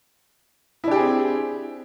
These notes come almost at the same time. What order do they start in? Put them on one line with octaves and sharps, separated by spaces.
E4 D4 G4 G#4 C4